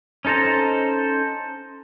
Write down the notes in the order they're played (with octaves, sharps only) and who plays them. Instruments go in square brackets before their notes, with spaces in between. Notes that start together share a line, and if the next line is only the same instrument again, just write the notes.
[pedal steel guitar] C#4 D#4 A4 C5 A#5